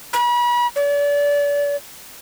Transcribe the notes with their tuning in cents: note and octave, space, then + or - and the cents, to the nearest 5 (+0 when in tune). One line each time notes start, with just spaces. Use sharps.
B5 -40
D5 -35